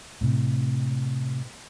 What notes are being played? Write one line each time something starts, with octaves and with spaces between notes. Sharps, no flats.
A2 C3